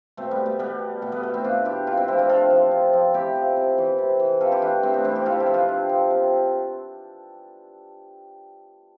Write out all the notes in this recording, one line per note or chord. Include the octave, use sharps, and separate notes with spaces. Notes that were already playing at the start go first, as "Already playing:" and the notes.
B2 A3 C4
G3 B3
A3
B2 G3 B3
B2 A3
G3 B3
A3
C4 E4
B2 D4 F4
E4 G4
C3 D4 F4
C4 E4
F3 C4 E4
D4 F4
C3 F4 A4
F3
C3
F3
C3 E4 G4
F3
C3
E3
C3
E3
C3 F4 A4
E4 G4
E3 D4 F4
C3 A3 C4
B3 D4
E3 C4 E4
E4 G4
C3 F4 A4
E4 G4
F3
D4 F4
C3
F3
C3